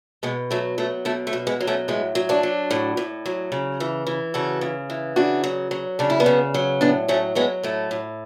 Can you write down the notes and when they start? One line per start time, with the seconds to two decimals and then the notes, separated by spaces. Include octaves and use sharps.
0.23 B2 G#3 B3
0.51 F#3 A3
0.78 F#3 A3
1.05 B2 A3
1.27 A3
1.33 B2
1.47 G#3 B3
1.61 F#3
1.67 A3 C#4
1.88 A2 G#3 B3
2.15 F#3
2.29 D4 F#4
2.43 F#3
2.71 A2
2.97 A2
3.26 F#3
3.52 C#3
3.80 E3
4.07 E3
4.34 C#3 F#4 A4
4.61 C#3
4.90 E3
5.16 C#3 D4 F#4
5.44 F#3
5.71 F#3
5.99 C#3 D4
6.10 E4
6.20 B3 D4
6.26 C#3
6.54 F#3
6.81 A2 B3 D4
7.08 F#3 A3 C#4
7.35 F#3 G#3 B3
7.63 A2 A3
7.91 A2